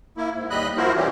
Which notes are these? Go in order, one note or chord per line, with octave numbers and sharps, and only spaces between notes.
A#3 E4
G#2
D#2 G3 D#5 B5 F#6
F3 E4 F#4 A#4 C5
B2 E3 G3 A3 C#4 G4